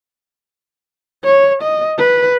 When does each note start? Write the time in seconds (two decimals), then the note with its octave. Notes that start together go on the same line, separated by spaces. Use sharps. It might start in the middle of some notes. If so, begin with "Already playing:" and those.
1.24 C#5
1.63 D#5
1.99 B4